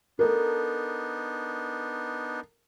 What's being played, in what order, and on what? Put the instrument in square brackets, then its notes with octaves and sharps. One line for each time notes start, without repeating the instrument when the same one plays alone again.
[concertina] B3 D4 D#4 [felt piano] A4 A#4